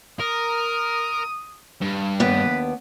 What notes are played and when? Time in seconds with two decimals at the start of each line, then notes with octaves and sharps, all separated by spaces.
0.20 A#4 D#6
1.81 G2
2.20 D#2 B3 D4 B4